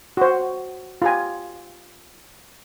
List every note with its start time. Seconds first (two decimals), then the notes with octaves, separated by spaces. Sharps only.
0.17 F#4 C5
1.02 F4 G4 G#5